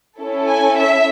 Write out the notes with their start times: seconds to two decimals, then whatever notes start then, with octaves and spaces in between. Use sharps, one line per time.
0.20 C#4 E4 A4
0.48 G#5
0.77 E5